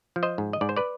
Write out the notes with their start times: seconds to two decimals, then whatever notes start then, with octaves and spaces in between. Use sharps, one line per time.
0.16 F3
0.23 C5 D#5
0.38 G#2
0.53 D#5
0.61 G#2 D5
0.69 C5
0.77 B4 D5